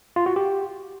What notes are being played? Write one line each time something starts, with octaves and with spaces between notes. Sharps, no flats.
F4
F#4
G4